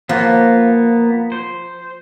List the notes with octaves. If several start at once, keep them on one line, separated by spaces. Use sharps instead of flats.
F3 A#3 B3
C5